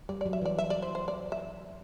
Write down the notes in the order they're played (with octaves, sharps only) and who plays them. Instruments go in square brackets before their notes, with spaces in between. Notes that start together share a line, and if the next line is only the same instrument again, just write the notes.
[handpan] G3 [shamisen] D5
[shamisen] D5
[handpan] F#3
[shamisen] E5
[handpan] E3 [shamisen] D5
[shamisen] E5
D5
C5
C5
D5
E5